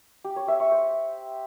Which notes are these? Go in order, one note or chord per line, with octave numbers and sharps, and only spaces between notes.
G4
C#5
E5
C#6
C5